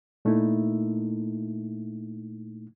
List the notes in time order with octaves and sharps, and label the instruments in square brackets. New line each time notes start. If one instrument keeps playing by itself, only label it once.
[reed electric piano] A#2 A3 A#3 D#4 E4